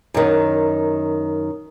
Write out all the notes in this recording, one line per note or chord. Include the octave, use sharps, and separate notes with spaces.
F#2 D#3